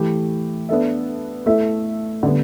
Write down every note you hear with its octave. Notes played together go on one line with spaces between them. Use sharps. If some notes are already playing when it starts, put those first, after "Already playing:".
Already playing: E3 A3 G4
B3 D4 A4 E5
A3 E4 A4 E5
D3 G3 B3